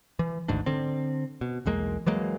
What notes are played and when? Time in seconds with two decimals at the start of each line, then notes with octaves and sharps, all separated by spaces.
0.19 E3
0.48 G#1 D2 G#2 D4
0.66 D3 C4
1.41 B2
1.66 B1 E2 G#3 A#3
2.06 E3 F#3 G#3 A#3